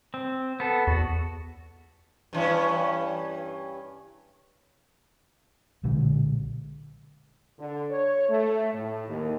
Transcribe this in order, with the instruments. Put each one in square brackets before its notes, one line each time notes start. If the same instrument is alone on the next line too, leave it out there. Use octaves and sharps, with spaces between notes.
[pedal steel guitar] C4
B3 A4
[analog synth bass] E2 [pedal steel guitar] F#4
[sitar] G2 E3 C#4
[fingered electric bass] B1 A#2 D3 G#3
[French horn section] D3
C#5
A3
A2
D#2